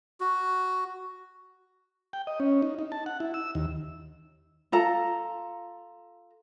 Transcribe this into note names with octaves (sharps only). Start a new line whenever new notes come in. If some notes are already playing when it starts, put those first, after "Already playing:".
F#4
G5
D#5
C#4
D#4
D#4
A5
F#5
E4
E6
D#2
F4 A4 A#5